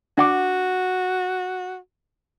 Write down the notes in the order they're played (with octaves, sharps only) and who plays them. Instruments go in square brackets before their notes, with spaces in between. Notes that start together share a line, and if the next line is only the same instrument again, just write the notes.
[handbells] D4 F#5 D6 [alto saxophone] F#4